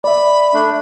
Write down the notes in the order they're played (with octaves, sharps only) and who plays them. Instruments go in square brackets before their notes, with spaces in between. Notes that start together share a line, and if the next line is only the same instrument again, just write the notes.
[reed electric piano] D5 E5 [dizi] B5
[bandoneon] A3 D4